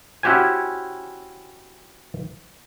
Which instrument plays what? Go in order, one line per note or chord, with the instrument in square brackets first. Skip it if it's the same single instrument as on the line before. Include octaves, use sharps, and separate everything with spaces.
[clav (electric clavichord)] C#4 E4 F#4 G4 C5 G#5